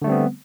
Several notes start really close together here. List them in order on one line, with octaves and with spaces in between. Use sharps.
D3 A3 G3 C4 B3